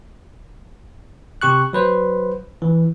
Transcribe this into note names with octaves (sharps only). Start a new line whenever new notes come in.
C3 G4 C#6 F#6
F#3 B4 C5
E3